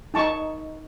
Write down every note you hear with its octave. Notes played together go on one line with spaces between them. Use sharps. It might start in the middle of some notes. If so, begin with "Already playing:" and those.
D#4 A5 C#6